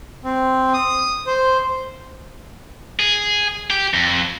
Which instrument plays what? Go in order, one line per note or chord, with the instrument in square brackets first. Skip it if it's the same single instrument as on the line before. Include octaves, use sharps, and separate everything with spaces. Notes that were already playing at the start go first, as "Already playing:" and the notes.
[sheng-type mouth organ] C4
D#6
C5
[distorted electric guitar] G#4
G4
F2